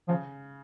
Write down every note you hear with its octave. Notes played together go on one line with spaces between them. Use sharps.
C#3 F3